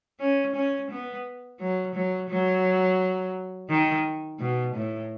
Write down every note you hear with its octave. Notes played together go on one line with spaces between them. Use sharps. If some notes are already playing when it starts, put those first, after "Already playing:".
C#4
C#4
B3
F#3
F#3
F#3
D#3
B2
A2